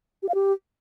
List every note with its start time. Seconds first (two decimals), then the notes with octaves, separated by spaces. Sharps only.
0.23 G4
0.29 F5
0.35 G4